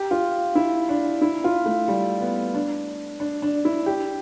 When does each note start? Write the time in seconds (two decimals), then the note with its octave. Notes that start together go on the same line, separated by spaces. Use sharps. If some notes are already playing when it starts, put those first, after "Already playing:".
Already playing: G4
0.11 F4
0.55 E4
0.89 D4
1.22 E4
1.44 F4
1.66 A3
1.88 G3
2.21 B3
2.54 D4
3.20 D4
3.42 D4
3.65 E4
3.86 G4